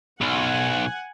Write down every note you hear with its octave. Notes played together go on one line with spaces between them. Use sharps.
B1 F#5 G#5